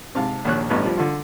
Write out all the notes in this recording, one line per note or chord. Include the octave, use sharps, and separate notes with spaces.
G#2 C3 F5 A5
A#1 D#2 C#5 F#6
A1 G2 B3 D#4
F3 G3
D3 F4